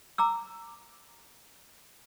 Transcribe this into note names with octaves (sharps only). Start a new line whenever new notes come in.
A#5 D6 E6